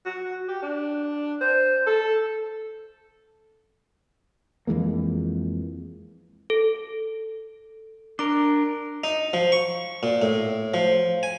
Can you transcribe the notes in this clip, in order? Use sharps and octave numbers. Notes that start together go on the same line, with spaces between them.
F#4
G4
D4
C5
A4
F2 E3 G#3 A#3
A4
D4 A#4 D6
D#4
F3
C#6
A#2
A2
F3
G#5